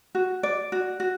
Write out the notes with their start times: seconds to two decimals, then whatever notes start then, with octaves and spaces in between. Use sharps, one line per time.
0.15 F#4
0.43 D5
0.72 F#4
1.00 F#4